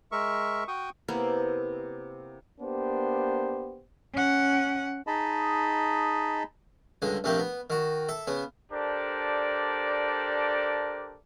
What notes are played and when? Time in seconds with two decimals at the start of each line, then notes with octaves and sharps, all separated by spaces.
0.12 G#3 A#4 E5 C#6
0.68 F#4 G5 C#6 D#6
1.08 C3 A#3 B3 E4
2.61 A#3 B3 D4 G4 C5
4.14 C#4 F#5
5.07 D#4 G#4 D#5 A5 B5
7.02 C#2 G2 D3 G#3
7.24 A#1 C3 A3 A#3 G4
7.39 B3
7.70 D#3 F#4
8.09 A4 E5
8.27 C#3 B3
8.71 D4 G4 A4 A#4 C5 D5